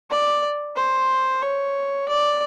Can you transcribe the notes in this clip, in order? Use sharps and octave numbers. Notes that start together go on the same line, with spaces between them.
D5
C5
C#5
D5